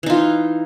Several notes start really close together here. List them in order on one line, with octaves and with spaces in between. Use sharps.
E3 D#4 F4